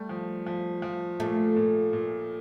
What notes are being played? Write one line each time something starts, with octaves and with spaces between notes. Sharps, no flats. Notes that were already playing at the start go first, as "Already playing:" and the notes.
Already playing: G3 A3
F3
F3
F3
A#2 A3
A#2
A#2